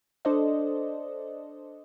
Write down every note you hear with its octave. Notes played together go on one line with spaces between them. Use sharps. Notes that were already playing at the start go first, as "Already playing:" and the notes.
D4 A4 C5 D5 D#5